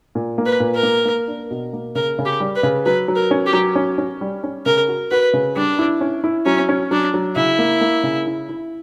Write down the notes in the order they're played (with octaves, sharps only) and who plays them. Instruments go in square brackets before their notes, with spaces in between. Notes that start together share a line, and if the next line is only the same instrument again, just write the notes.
[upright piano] A#2
A#3
[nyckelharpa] B4
[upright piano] A#2
[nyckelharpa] A#4
[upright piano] A#3
A#3
D4
B2
A#3
[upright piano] C#3 [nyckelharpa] A#4
[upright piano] C#3
[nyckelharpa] G4
[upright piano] G3
[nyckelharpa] B4
[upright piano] C#3
[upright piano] F#3 [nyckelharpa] B4
[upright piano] F#3
[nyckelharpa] A#4
[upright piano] C#4
[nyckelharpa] G4
[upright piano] F#3
C#4
C#4
G3
C#4
[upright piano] C#3 [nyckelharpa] A#4
[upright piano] F#4
[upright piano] F#4 [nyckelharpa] B4
[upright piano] C#3
[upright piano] G3 [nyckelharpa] D4
[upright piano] E4
C#4
E4
[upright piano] F#3 [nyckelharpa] C#4
[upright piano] C#4
[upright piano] F#3 [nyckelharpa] D4
[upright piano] F#3
[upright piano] C#3 [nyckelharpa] E4
[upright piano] A#3
A#3
C#3
E4
E4